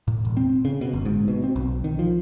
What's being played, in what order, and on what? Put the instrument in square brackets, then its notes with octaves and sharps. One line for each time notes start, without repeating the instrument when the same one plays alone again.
[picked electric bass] A2
E1
C4
C#3
B2
G1
G#2
B2
C4
B1
D#3
F3